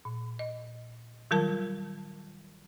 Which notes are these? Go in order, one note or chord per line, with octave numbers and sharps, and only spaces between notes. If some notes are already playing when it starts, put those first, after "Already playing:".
A#2
D#5
D#3 F#3 G3 F4 A#4 A5